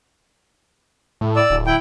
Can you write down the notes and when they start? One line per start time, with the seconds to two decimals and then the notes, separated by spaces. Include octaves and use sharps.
1.21 A2
1.36 D5 E6
1.50 D1
1.67 E4 G5